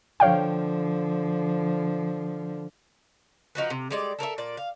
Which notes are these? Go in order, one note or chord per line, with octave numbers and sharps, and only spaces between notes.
D3 F3 C#5 F5 G5
F3 D#4 F#4 B4
C3
G3 G#3 D5
A4 A#4 C#5 E5
A#2 D5
F5